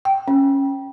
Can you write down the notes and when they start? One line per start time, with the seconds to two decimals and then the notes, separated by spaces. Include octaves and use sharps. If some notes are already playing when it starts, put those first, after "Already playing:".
0.05 G5
0.28 C#4